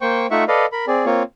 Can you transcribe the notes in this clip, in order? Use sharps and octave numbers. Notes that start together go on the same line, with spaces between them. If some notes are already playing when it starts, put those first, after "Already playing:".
A#3 C5 G5 C#6
A3 D#4 F4 E5 F#5 C#6
A4 B4 D5 D#5 F5
A#4 B5
C4 G#4 D5
A#3 C4 F4 C#5